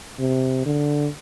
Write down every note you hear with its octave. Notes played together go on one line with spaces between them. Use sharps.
C3
D3